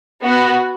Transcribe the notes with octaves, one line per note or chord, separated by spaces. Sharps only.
B3 F#4